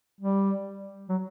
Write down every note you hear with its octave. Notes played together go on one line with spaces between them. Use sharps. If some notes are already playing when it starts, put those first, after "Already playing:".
G3
F#3